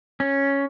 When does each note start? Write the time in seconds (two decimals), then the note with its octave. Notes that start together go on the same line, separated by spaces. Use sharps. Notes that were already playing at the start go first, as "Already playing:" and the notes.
0.20 C#4